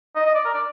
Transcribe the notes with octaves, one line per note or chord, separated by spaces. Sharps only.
D#5
D#5
D5
A#4
D5